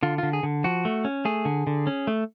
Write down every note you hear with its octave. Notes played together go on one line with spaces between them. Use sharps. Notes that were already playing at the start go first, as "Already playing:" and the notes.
D3 F4
D3 F4
G#4
D3
F3 F#4
A3
C#4
A3 G#4
D3
D3
C#4
A3